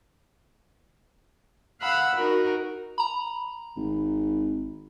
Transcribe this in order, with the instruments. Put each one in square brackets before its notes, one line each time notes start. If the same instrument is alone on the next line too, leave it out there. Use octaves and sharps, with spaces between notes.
[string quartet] F5 F#5 B5 E6
D#4 F#4 A#4
[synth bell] A#5 B5
[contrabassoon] G#1